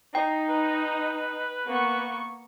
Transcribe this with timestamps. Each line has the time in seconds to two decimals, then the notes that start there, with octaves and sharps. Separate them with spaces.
0.15 D#4 G5
0.49 B4
1.66 A#3 B3 C#6